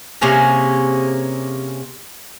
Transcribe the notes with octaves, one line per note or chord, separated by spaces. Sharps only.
C3 A#3 C#4 G#4